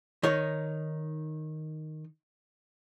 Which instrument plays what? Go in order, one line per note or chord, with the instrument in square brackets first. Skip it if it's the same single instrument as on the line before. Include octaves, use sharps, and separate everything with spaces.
[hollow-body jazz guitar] D#3 D#4 C#5